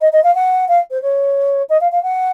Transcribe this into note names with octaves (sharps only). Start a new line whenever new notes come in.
D#5
D#5
F5
F#5
F5
C5
C#5
D#5
F5
F5
F#5